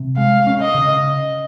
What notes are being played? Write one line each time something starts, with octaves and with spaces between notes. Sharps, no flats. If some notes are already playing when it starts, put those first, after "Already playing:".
Already playing: C3
G#3 F5
C#4
D#5
C#3